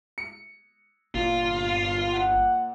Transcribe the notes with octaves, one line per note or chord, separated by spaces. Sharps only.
C#7
G1 A#2 F4
F#5